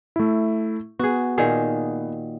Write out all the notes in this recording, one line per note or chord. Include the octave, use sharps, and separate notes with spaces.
A3 E4
B3 F#4 G#4
A#2 D#3 G#4